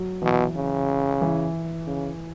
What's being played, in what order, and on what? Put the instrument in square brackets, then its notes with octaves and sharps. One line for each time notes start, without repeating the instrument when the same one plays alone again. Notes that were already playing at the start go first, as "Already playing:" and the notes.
Already playing: [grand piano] F#3
[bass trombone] B2 [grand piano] E3
[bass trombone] C#3
[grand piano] E3
[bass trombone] C#3